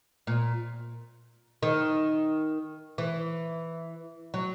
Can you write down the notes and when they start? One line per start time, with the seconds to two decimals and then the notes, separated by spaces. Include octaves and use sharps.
0.27 A#2
1.63 D#3
2.98 E3
4.34 F#3